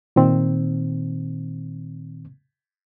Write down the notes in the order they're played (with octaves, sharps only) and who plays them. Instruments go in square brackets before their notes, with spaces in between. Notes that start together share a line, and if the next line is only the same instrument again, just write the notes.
[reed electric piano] A#2 D#3 C4